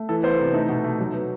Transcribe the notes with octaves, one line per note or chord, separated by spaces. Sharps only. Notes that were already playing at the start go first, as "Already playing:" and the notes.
Already playing: A3
E3 A4
B3 C5
C3
A3 D#4
B2
A3
F#3
B3